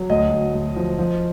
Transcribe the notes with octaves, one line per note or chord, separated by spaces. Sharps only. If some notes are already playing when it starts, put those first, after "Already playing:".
Already playing: F#3
D2 D#5
D2
D2
F3
F3